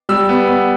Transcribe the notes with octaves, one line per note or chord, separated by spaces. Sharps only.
G3 E6
B3
B3